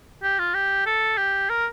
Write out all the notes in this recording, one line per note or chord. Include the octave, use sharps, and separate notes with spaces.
G4
F4
G4
A4
G4
A#4